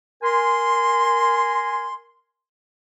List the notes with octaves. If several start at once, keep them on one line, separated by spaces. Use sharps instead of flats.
A#4 G#5 C6